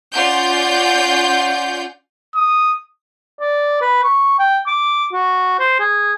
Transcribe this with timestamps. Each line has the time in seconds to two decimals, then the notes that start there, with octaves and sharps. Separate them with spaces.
0.13 C#4 F4 D5 F#5 G6
2.35 D#6
3.40 D5
3.81 B4
4.04 C#6
4.39 G5
4.67 D6
5.13 F#4
5.59 C5
5.80 G#4